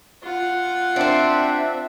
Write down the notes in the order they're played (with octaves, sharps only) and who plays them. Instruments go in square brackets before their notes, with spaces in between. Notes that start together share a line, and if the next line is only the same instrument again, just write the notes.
[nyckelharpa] F4 F#5
[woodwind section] C4 D4 [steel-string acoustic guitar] C5 D5 [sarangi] E5